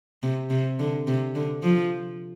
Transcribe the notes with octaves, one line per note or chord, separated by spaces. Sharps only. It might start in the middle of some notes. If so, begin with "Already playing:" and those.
C3
C3
D3
C3
D3
F3